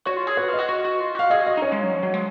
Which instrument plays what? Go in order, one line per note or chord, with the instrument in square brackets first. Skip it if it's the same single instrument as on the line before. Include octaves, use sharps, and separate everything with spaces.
[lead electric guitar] F#4 [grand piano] C#5
[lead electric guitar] F4
G#4
[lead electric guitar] F#4 [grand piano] B4
[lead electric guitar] F4
[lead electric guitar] F#4 [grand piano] D#5
[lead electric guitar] F#4
F#4
F4
[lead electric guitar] F#4 [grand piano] F5
[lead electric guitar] G#4 [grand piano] D#5
[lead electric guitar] F#4
[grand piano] D#5
[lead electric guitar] D#4
[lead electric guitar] C#4 [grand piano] C#5
[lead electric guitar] G#3
F#3
F3
F#3
G#3